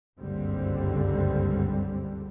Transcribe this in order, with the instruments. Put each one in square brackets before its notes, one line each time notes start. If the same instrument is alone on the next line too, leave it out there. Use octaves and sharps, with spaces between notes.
[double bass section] F#1 C#2 G2 D3 G3 C4